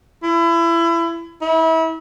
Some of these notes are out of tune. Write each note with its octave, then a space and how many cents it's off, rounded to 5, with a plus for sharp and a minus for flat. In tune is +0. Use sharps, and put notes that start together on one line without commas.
E4 +30
E4 -30